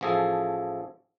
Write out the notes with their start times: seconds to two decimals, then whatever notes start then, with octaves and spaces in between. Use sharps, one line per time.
0.01 A1 E3 F3 G#4 A4